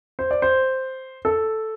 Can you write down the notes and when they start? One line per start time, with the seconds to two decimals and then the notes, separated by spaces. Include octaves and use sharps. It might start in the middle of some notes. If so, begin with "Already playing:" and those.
0.19 C5
0.31 D5
0.42 C5
1.25 A4